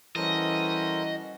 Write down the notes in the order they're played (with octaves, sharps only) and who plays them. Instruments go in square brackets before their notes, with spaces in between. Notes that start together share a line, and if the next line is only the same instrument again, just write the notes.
[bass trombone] E3 [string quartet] G3 C#4 F#4 [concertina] A4 A#4 C5 [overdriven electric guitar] D#5